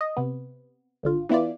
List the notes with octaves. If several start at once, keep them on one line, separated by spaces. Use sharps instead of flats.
D#5
C3 B3
G#1 D3 F4
E3 B3 E4 F4 D5